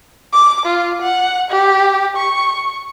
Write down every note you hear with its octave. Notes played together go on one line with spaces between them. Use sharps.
D6
F4
F#5
G4
C#6